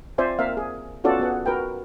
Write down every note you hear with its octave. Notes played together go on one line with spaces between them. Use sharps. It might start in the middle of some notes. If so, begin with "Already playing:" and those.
C4 F4 C5 D5 E5 G#5
A#3 C4 A#4 E5 F5
G#4
B3 C#4 F4 F#4 A4 D5
B3 G#4 F#5
F#4 A#4 B4 G5